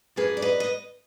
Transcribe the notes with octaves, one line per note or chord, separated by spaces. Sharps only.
F#2 F3 A#3 G#4 B4
D5
B4 D#5
D#5